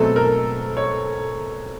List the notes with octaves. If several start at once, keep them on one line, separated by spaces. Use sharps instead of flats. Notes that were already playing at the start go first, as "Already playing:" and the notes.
Already playing: B2 F#3 A3 C4 A4
A#4
C#5